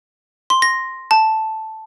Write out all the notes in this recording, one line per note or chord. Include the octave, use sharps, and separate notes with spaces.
C6
A#6
A5